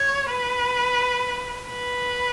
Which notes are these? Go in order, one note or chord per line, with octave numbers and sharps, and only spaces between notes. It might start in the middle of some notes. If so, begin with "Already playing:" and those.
Already playing: C#5
B4
B4